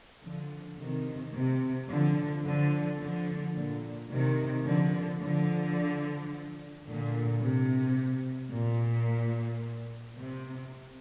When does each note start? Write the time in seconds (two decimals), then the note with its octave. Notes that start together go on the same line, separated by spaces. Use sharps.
0.25 D3 F3
0.80 C3 D#3
1.35 C3
1.90 D3 F3
2.46 D3 F3
3.00 D3 F3
3.56 A#2 D3
4.11 C3 D#3
4.66 D3 F3
5.22 D3 F3
6.87 A#2 D3
7.42 C3
8.53 A#2
10.18 C3